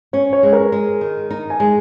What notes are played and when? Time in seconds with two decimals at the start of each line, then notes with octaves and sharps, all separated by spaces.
0.13 C#4 C#5
0.33 C#5
0.43 G#3
0.53 A#4
0.72 G#3
1.01 D#3
1.31 D#4
1.50 G#5
1.60 G#3